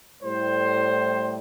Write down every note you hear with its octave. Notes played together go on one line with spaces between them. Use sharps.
A2 G3 C5